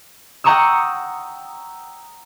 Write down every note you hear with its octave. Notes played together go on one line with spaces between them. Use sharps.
F#5 G5 A#5 C#6 D#6 E6